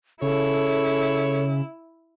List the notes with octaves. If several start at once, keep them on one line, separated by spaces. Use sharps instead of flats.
C#3 E4 A4 C#5